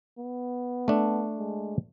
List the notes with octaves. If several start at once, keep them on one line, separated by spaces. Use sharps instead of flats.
B3
A3 D4
G#3